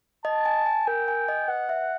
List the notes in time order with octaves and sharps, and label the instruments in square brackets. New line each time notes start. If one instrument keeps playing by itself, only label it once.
[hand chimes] D#5 [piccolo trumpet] A5
[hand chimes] G#5
G#5
[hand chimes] A#4 [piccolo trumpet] G5
[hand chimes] G#5
D#5
[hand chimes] B4 [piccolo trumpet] F#5
[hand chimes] E5